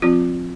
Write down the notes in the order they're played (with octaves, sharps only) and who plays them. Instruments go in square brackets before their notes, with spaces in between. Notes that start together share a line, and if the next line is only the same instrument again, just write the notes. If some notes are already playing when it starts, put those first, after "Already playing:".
[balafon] F3 C4 F4